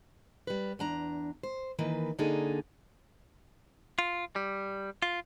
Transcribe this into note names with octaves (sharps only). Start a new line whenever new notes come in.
G3 B4
E2 D4 A#5
C5
D#3 E3 A#3 B4
D3 A#3 D4 D#4 G#4 A4
F4
G3
F4